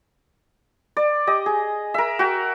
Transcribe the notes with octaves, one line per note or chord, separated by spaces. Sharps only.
D5
G4 D#5
G#4
A#4 E5
F#4 G5